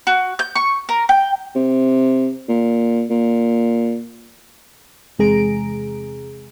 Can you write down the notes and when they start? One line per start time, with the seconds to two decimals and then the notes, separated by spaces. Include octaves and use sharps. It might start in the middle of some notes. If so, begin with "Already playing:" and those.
0.07 F#4
0.39 G6
0.55 C#6
0.89 A#4
1.09 G5
1.55 C3
2.49 A#2
3.10 A#2
5.19 E2 C3 G#3 G#4 A#5 D7